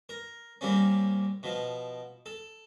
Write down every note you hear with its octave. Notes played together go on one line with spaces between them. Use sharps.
A#4
A#2 G3 A#3 C4 C#4
B2 F3
A4